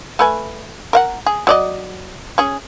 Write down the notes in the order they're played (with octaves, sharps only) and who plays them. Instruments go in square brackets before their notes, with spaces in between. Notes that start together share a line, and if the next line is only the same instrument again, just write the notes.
[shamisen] A3 B4 G#5
A#4 F5 F#5
G#4
F#3 D5 D#5
C#4 G#4